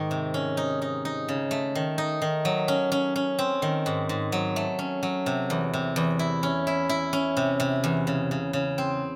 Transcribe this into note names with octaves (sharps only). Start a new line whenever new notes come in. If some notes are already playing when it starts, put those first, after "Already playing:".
Already playing: G#2 D#3
C3
C#4
D#4
D#4
D#4
C#3
A3
D#3
D#4
D#3
F#3
C#4
C#4
C#4
C4
D#3
G#2
G#2
F#3
A3
C#4
F#3
C3
E2
C3
E2
E4
C#4
E4
E4
C#4
C3
C3
E2
C#3
C#3
C#3
C4